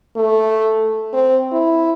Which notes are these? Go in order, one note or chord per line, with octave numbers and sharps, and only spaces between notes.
A3
C4
E4